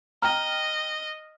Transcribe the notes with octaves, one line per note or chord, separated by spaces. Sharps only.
D#5 G5 A#5 F6